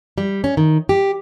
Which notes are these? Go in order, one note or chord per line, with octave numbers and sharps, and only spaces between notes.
G3
C#4
D#3
G4